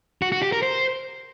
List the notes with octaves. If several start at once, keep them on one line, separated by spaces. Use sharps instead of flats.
F#4
F#4
G4
A#4
C5